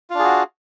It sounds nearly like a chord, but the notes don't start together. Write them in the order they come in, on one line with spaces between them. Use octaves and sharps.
F4 D4 G#4 F#4